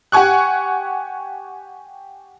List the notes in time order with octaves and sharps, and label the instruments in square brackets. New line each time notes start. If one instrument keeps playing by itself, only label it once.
[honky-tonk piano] G4 F#5 G#5 C#6 F#6